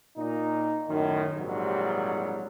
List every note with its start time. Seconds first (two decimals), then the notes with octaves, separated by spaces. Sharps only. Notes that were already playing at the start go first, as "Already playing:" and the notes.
0.17 A#2 D#4
0.88 F#2 A2 D#3
1.36 A#1 G#2 C3 F#3 G3